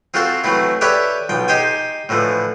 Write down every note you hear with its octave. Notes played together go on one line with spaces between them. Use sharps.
C4 F4 F#4 A4 C5 F5
E3 F#3 A3 C4 E4
G4 A4 B4 C#5 D5 E5
B1 F3 G5
D#4 G4 C5 G5 G#5
A2 D3 E3 F3